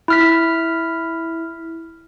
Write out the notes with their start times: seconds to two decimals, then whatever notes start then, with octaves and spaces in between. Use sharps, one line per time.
0.08 E4 F6 B6